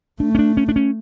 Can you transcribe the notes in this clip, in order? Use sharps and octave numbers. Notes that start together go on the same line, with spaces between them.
A3 D4
C#4
D4
C#4
D4
C#4